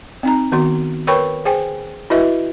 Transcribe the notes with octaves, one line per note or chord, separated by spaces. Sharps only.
C4 D#4 A#5
D#3 B3 F#4 C6
A#4 B4 C#5 G5 B5 C#6
G#4 C5 G5 G#5
E4 F#4 B4 D#5 E5